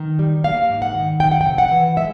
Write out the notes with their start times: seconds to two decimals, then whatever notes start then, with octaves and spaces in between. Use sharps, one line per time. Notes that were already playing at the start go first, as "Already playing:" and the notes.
Already playing: D#3
0.19 G3
0.44 A#3 F5
0.70 G#2
0.82 F#5
0.95 D#3
1.20 F2 G5
1.31 F#5
1.41 C3 G5
1.58 F#5
1.71 E3
1.96 G#3 E5